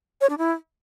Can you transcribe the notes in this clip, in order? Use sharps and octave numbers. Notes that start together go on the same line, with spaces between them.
C#5
D4
E4